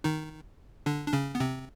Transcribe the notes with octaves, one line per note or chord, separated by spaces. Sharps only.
D#3 D#4
D3 D4
D4
C#3 C#4
B3
C3 C4